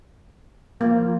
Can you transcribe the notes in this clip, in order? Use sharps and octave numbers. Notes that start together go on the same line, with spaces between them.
F3 A#3 F4